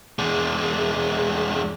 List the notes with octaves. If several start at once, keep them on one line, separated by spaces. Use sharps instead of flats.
E2 G#3